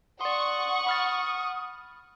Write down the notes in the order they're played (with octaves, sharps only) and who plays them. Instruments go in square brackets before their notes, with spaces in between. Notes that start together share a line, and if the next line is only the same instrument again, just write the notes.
[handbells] D5 C6 [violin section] F#5 C#6 [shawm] D#6
[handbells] B5 F6 A6